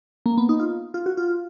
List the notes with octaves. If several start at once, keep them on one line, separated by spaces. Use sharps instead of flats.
A#3
B3
D#4
F4
F4
F#4
F4